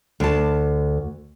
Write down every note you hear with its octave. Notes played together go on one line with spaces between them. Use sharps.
D2 A5